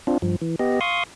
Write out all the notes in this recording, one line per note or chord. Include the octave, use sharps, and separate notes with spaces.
C4 D4 F4
G2 F3
E3
B3 G4 D#5
F5 C6 C#6 D#6